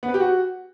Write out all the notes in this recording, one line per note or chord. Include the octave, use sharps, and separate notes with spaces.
B3
B4
G4
F#4